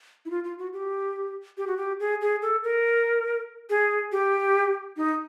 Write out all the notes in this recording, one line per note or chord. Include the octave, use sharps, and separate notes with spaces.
E4
F4
F4
F#4
G4
G4
F#4
G4
G#4
G#4
A4
A#4
G#4
G4
D#4